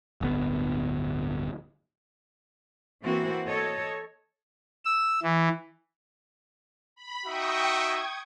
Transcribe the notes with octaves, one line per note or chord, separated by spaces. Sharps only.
D1 G1 D3 B3
E3 A#3 C4 F#4
A4 C#5 D#5
E6
E3
B5
D#4 F#4 E5 G5 C#6 D#6
G#6